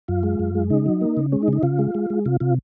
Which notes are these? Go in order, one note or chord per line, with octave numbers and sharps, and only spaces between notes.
F#2 F4
G#3
F#2
G#3
C#3 D#4
F#3
A#3
C#3
G#3 C#4
D#4
C#3
D#4
C#3 F4
G#3
G#3
G#3
C3 F4
C3 F4